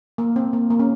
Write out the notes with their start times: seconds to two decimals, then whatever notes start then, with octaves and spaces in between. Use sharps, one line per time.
0.18 A#3
0.36 C4
0.53 A#3
0.70 A#3
0.79 C#4